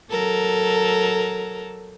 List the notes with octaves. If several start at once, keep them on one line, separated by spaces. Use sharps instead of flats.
F#3 A4 A#4